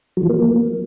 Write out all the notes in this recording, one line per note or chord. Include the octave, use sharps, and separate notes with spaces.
F#3
F3
A#3